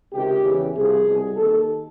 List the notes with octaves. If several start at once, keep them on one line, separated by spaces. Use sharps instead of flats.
C#2 C3 D#3 G4
E2 C#3 E3
C2 C3 F3 G#4
C2 B2
D#2 D#3 A4